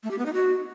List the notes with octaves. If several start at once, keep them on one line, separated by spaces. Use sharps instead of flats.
A3
G4
B3
D#4
F#4